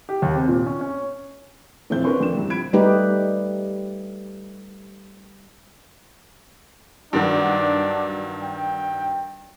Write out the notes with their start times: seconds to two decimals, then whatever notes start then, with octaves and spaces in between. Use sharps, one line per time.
0.09 G4
0.22 D#2
0.36 C3
0.48 A#2
0.66 C#4
0.81 C#4
1.90 A#1 E2 C4 E4 G6
2.04 C#4 D4 A#4 B4 C6 C#6
2.20 F2 D4 E7
2.35 E2 G2 C3
2.50 F3 B5 G#6 D7
2.73 G3 A3 D#4 G4 B4
7.13 G2 D#3 F#3 D4
8.43 G5